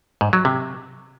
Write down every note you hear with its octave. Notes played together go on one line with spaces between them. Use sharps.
G#2
F#3
C3